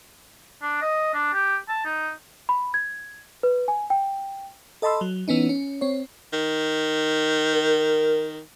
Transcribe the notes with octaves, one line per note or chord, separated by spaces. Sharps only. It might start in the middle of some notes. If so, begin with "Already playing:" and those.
D4
D#5
D4
G4
A5
D#4
B5
G#6
B4
G#5
G5
A4 D#5 A5 B5 C6 E6
F#3
E3 B3 C#4 D#4
C#4
C4 C#5
D#3
A#4